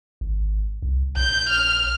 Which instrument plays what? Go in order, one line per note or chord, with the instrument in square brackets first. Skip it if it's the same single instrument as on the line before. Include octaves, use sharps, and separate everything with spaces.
[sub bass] G#1
C2
[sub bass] A#1 [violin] G6
[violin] F6